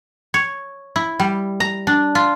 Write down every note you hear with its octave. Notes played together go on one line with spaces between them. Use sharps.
C#5
E4
G3
A#5
D4
F4